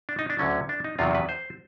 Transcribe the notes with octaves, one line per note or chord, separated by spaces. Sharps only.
D4
D#4
D4
D2 D3 F#3 C#4
D4
D#4
E2 C3 D#3 F#3 F4
B4
C5